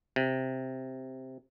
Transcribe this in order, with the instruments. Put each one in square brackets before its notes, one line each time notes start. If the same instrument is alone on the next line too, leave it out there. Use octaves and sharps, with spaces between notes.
[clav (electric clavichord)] C3